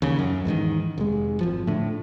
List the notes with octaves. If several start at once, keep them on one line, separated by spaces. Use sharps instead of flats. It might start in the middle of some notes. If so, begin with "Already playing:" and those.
D#2 C#3
F#2
E2 G#2 D3 D#3
F1 G#3
G#1 F3
A2 D3